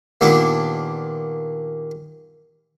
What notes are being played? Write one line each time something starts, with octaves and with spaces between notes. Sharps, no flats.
D#2 A#2 B3 D4